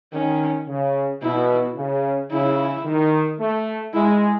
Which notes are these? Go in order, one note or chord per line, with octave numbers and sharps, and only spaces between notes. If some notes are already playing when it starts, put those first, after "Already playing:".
D#3 C#4
C#3
B2 E4
C#3
C#3 E4
D#3
A3
G#3 E4